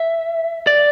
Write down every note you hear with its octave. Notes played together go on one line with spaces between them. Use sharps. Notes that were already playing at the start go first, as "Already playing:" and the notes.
Already playing: E5
D5